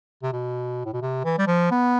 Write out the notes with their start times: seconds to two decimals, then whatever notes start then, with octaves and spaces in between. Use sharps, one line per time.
0.23 C3
0.33 B2
0.86 A2
0.93 B2
1.02 C3
1.24 E3
1.38 G3
1.47 F3
1.71 B3